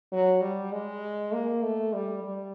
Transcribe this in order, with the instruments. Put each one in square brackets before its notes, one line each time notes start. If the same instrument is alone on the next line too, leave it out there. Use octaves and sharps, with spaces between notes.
[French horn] F#3
G3
G#3
A#3
A3
G3
G3